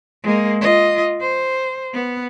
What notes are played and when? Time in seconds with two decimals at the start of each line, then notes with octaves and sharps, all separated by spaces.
0.23 G#3 A#3
0.61 F4 D#5
1.21 C5
1.93 B3